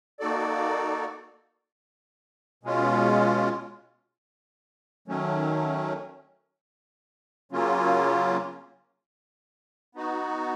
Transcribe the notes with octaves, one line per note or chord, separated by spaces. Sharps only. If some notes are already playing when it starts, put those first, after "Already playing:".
A#3 D#4 F#4 A4 D5
B2 G#3 C#4 F4
D#3 F#3 A3 C#4
C#3 F#3 A#3 C#4 F4
B3 D#4 F#4